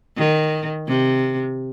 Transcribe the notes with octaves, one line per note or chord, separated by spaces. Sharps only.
D#3
C3